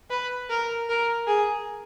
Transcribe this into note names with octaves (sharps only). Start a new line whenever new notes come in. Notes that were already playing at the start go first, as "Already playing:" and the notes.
B4
A#4
A#4
G#4